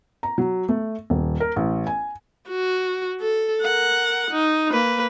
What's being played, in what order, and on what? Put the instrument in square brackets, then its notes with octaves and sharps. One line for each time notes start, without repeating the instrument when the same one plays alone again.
[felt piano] A#5
F#3
A3
D#1
A#4
A1
G#5
[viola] F#4
A4
A#4 F#5
D#4
A#3 B4